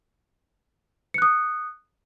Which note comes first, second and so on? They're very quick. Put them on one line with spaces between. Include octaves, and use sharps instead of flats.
C#7 F#6 D#6